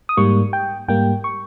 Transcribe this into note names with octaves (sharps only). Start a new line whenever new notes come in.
D#6
G#2 G3 A#3 C#6
G5
G#2 G3 A#3 G5
C#6